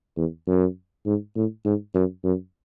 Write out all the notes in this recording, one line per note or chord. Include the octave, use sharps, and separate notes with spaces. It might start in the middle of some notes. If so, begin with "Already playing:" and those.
E2
F#2
G#2
A2
G#2
F#2
F#2